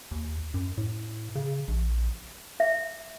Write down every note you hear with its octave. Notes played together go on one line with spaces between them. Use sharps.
D#2
F#2
A2
C#3
A#1
E5